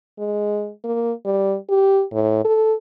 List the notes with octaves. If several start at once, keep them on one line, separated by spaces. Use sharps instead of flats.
G#3
A#3
G3
G4
A2
A4